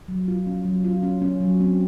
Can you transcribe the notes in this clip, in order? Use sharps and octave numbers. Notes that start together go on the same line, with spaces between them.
F#3
F4
C#4
F#3
F4
C#4
C#4
F#3
C4